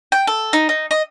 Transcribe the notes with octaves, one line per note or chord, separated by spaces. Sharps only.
G5
A4
D#4
D#4
D#5